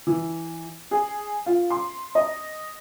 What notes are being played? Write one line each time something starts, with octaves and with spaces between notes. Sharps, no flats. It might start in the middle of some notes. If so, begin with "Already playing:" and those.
E3
G#4
F4
C6
D#5